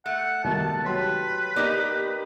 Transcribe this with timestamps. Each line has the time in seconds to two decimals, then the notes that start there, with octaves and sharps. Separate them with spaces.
0.06 A3 F#5
0.44 C2 B2 D#3 A5
0.84 F#3 G4 B4 C6
1.56 A#3 D#4 G4 D5